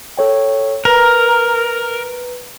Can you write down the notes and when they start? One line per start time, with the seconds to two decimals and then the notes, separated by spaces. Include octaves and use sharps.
0.17 A4 C#5 G5
0.85 A#4 B4 A#5